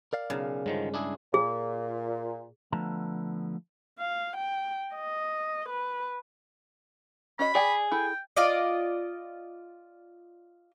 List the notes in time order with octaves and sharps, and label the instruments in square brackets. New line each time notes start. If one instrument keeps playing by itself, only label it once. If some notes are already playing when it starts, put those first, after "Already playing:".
[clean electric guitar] A#4 D5 F5
[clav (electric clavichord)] B1 [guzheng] C#3
[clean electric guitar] G2 G#3 C#4 [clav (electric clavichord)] D3 D#3 F3
[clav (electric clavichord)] D4 E4 G#4
[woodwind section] A#2 [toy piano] G#4
[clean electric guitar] D3 F3 A3 B3 A5 A#5
[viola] F5
G5
D#5
B4
[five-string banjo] C#4 F#4 D#5 [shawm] B5
[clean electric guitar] G#4 [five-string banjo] D5 G5
[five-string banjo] E4 A4 [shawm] G5
[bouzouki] F4 D5 D#5